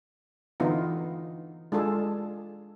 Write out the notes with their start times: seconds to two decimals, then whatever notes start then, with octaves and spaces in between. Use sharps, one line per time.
0.60 D3 E3 B3 D#4 F4
1.72 G#3 D4 F4 G#4 A4